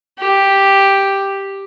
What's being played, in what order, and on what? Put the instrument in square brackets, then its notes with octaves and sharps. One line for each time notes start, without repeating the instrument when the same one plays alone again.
[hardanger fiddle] G4